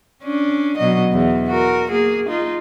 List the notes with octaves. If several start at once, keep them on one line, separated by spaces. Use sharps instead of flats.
C#4 D4
B2 F#3 D#5
E2
F#4 A#4
A#3 G#4
D#4 F4